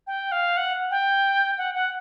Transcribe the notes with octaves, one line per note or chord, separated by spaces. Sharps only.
G5
F5
F#5
G5
F#5
F#5